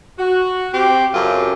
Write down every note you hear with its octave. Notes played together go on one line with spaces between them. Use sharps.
F#4
C4 G4
F#2 C#3 F4 G4 A4